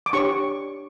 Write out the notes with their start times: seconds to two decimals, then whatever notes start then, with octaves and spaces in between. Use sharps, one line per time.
0.06 D6
0.13 D4 G4 C#5 C#6